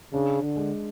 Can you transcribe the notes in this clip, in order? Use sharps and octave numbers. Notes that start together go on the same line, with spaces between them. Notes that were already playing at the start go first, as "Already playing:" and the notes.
C#3 D4
D3
G#3